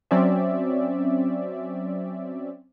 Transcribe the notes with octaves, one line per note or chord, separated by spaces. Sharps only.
F#3 C4 C#4 D5 E5